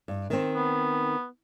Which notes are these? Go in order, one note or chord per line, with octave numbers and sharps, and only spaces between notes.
G2
D#3 C4
B3